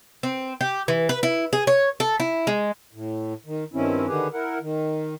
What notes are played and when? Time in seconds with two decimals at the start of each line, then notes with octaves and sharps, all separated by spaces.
0.23 C4
0.61 G4
0.88 E3
1.09 B4
1.23 E4
1.53 G#4
1.67 C#5
2.00 A4
2.20 E4
2.47 G#3
2.94 A2
3.46 D#3
3.73 G2 D#3 C4 C#4 E4
4.07 D3 D#3 G4 G#4 B4
4.33 E4 A#4 F#5
4.61 D#3